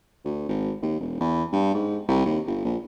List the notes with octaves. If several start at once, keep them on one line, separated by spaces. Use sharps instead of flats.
D2
G#1
D#2
E1
E2
G2
G#2
C2
D#2
G1
A#1